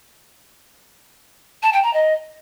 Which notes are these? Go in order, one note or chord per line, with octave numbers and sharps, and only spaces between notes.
A5
G5
A#5
D#5